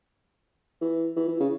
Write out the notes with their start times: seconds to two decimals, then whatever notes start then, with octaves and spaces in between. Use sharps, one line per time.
0.82 E3
1.17 E3
1.28 E3
1.40 C#3